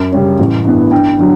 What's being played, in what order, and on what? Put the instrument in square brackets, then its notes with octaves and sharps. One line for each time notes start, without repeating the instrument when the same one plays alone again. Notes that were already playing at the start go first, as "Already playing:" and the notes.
Already playing: [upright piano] F#2
C#3 G3 C#4
A1
G2 E3 B3
G2 G5
D3 F#3